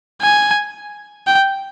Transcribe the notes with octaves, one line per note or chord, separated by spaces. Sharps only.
G#5
G5